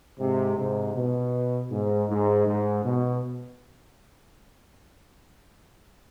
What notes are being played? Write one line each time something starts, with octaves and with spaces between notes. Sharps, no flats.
G#2 C3
G#2 C3
B2
G#2
G#2
G#2
B2